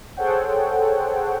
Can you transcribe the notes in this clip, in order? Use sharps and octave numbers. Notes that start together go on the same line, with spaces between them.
G#4 A4 C5 C#5 F#5 G5